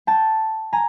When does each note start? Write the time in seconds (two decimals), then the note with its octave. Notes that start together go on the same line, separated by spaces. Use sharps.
0.07 G5 A5
0.73 G#5 A#5